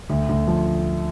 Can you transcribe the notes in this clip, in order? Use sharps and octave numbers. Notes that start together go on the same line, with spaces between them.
D2
D2
F3